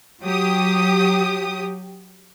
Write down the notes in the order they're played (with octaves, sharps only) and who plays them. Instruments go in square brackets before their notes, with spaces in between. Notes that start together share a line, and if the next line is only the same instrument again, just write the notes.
[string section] F#3 G4 D#6